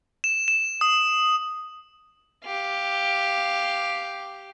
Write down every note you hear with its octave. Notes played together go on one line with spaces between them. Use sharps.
E7
E7
D#6
G4 F5